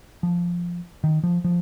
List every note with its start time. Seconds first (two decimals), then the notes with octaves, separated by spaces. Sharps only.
0.23 F3
1.04 D#3
1.24 F3
1.44 F3